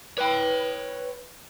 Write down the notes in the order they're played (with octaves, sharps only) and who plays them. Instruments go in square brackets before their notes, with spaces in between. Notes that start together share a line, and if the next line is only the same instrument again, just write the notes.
[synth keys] B4 [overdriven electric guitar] C#5 G5